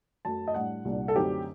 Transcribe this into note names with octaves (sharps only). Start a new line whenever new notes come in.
F#2 F#3 A3 A5
D#5
A2 G3 D4 F#5
C2 A#2 G3 D4
A4
F#2 D3 A3 C4 D#4 G4